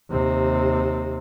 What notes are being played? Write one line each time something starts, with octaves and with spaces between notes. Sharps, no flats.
D#2 C3